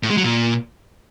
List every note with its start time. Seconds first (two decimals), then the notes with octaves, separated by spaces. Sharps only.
0.03 A2
0.10 G#3
0.17 F#3
0.24 A#2